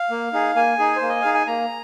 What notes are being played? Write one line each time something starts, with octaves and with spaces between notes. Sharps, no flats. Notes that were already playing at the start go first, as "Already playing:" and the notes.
Already playing: F5
A#3
D#4 G#4
A#3 G#5
D#4 G#4
C5
A#3
D#5
D#4 G#4 F5
G#5
A#3 A#5